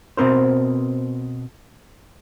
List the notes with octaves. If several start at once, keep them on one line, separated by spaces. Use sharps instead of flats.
B2 C4 A#4 C5